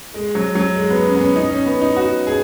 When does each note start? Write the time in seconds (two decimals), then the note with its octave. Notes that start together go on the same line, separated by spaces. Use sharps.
0.14 G#3
0.35 F#3
0.55 F#3
0.75 G#3
0.90 B3
1.06 C#4
1.16 B3
1.21 C#4
1.36 D#4
1.51 C#4
1.66 B3
1.81 D#4
1.97 F#4
2.27 G#4